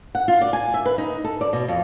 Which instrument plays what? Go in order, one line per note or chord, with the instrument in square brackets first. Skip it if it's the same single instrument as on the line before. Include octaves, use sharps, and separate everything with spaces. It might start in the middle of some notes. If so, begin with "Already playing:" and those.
[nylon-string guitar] F#5
F4
D5
G#5
E5
B4
D#4
A4
D5
B2
F2